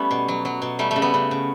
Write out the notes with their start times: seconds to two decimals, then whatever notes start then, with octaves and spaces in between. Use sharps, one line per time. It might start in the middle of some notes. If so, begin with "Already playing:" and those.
Already playing: G3 A3 B3 C#4 G4
0.11 B2
0.28 F#3
0.45 F#3
0.62 B2
0.79 G3 A3
0.91 A3
0.96 C#3
1.02 B3
1.14 C#3
1.31 C#3